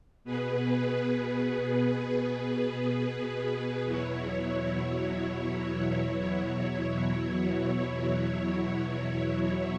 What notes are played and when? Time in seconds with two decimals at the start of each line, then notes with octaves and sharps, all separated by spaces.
0.24 B2 B3 G#4 B4
3.85 E2 B2 F#3 E4 C#5